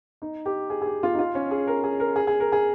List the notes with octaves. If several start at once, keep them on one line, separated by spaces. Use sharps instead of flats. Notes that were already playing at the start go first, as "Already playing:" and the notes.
D#4
G4
G#4
G#4
G4
F4
D#4
F4
C#4
G#4
A#4
G#4
A#4
G#4
G#4
A#4
G#4